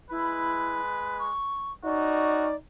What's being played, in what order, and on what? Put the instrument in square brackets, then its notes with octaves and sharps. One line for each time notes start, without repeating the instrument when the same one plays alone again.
[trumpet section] G#3 B4 [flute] E4
[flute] C#6
[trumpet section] C#4 F#4 [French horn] D#4 [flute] D5